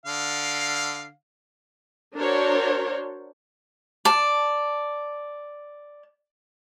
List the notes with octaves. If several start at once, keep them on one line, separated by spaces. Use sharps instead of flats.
D3 F5
D4 F#4 A#4 C5 C#5
D5 A5